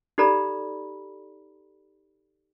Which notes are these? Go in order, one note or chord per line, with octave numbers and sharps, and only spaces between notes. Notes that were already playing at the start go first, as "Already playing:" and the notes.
D#4 G4 A4 D5 A#5 B5